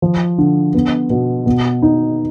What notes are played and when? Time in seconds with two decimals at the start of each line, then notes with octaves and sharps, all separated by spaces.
0.02 F3
0.38 D3
0.74 B3
1.10 B2
1.46 B2
1.82 D#4